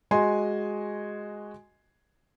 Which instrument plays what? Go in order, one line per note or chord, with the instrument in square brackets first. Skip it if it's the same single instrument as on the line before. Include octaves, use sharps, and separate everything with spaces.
[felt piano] G#3 F#4 D#5 G#5 C6